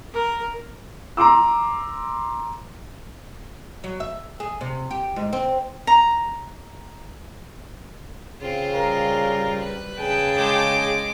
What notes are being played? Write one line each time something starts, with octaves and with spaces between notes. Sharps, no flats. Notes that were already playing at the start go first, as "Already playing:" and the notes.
A#4
A#5 C6 D6 E6
F#3
E5
G#4
C3
G4
G#2
C4
A#5
C#3 C4 F4
G3 A#4
B4
C#3 G#4 G5 A5
G#3 D6